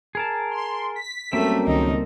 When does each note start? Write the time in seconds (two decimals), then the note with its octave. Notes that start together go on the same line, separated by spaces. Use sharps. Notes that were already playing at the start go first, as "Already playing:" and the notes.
0.15 G#4 A#4 A5
0.51 C6
0.96 B6
1.33 F#2 G3 A3 A#3 C4
1.67 C#2 D#3 D#4